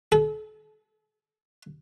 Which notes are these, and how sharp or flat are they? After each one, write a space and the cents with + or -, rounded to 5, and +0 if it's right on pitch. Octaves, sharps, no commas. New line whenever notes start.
A4 -40